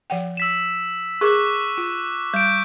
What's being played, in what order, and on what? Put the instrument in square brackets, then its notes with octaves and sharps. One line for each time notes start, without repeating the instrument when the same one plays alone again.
[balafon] F3 F#5 G5
[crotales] E6 B6 E7
[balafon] G#4 A#4 [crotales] C#6 D6 F#6
[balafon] F4
[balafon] G3 [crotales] G6 D7